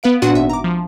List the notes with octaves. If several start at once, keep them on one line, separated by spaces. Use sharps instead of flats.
B3 B4 F5 D7
A#2 D4 F#4 F#5 C6 D#7
G#1 E5
A#5 D6
F3